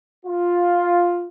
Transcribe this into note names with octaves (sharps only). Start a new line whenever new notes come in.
F4